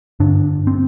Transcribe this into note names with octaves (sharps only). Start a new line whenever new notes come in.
G2 D3 D4
C4